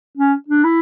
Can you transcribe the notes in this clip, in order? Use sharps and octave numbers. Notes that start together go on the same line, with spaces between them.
C#4
D4
E4